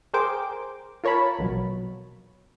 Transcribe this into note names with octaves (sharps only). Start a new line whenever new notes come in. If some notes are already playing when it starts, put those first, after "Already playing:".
G#4 A#4 C5 G5 D6
F4 A#4 C#5 A5 B5
A#1 B2 F#3